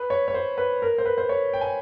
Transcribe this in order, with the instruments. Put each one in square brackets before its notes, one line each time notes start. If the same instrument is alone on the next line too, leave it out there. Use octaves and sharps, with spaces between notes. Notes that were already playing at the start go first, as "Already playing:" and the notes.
Already playing: [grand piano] B4
C#5
C#5
C5
B4
A#4
C5
B4
C5
C#5
G5
G#5